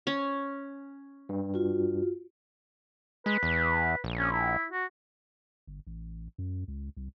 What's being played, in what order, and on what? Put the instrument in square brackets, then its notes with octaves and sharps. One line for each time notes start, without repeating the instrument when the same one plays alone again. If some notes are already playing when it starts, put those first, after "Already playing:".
[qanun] C#4
[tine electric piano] G2
[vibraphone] F4 F#4
[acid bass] G#3 [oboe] B4
[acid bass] E2
A#1
[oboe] C#4
E4
F#4
[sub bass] G1
A1
F#2
C#2
C2